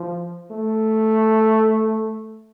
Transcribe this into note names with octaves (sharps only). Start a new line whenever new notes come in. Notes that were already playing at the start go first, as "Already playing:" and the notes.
Already playing: F3
A3